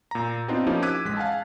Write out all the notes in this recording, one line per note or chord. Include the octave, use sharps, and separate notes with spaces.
A#2 A#5
B3 C4 D4 D#4 F4
F3 A#3 C#4 D#4 E4 G4
D6 E6 F#6 G#6 B6 D#7
A1 G#3 B6
F5 F#5 G#5 A5